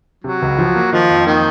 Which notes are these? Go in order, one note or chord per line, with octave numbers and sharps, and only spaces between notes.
C3 F#3
C#2
F3
A#3
D#3 F3
F2
D#3 A#3